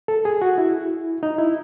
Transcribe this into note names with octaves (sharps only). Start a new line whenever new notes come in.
A4
G#4
F#4
E4
D#4
E4